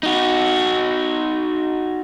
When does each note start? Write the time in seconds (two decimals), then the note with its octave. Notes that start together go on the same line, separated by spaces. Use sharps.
0.03 D#4 F#4